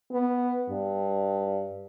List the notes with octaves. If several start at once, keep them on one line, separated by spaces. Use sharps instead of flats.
B3
G2